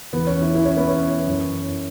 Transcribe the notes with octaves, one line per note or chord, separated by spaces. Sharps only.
E2 E3 B3
C#4
E4
E4
C#4
B3
C#4
F#2 E3